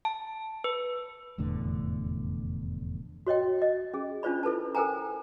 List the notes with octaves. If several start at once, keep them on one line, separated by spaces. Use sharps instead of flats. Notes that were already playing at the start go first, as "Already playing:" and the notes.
A5
B4
F1 E2 A2 D3
F#4 C#5 D#5 G5
D#5
C#4 G#4
C#4 D4 F4 C5 D5 B5
E4 A4 B4 A5
A4 A#4 C5 G5 G#5 A#5